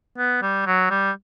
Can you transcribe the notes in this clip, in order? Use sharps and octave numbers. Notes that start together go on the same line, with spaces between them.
B3
G3
F#3
G3